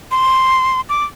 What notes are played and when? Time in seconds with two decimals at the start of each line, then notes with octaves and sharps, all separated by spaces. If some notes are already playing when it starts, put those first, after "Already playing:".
0.11 C6
0.89 D6